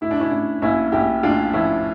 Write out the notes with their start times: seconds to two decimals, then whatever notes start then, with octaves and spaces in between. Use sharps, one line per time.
0.01 A2 E4
0.11 D4
0.20 C#4 E4
0.31 A2 D4
0.62 A#1 C#4 E4
0.92 A#1 E4 G4
1.23 A2 D4 F4
1.53 F3 C#4 E4